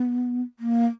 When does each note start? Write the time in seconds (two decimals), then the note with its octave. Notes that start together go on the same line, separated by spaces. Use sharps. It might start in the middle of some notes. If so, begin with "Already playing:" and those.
Already playing: B3
0.59 A#3